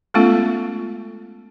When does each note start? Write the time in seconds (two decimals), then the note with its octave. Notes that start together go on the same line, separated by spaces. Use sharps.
0.14 G#3 A3 B3 C#4 F4 A4